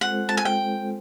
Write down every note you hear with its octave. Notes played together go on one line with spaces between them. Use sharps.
G#3 C4 F4 A4 C5 F#5
A5
G#5
G5